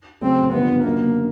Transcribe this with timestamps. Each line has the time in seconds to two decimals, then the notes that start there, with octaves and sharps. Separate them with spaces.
0.21 C#3 F#3 A3 C4
0.53 G1 G2 D3 F3 B3
0.84 F#1 F#2 D3 F#3 A#3 B3